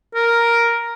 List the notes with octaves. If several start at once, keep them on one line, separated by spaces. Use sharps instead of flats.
A#4